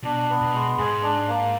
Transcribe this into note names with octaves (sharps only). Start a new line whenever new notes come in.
B2 D4
B3
B2
G#3
G#2 G#4
D4
A#3